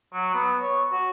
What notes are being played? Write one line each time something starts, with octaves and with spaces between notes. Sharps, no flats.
F#3
B3
C#5
F#4